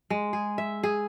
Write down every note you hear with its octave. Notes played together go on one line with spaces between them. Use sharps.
G#3
G#4
E5
G#4